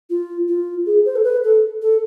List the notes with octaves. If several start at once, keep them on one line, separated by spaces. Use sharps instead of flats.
F4
F4
G#4
C5
A4
B4
A4
A4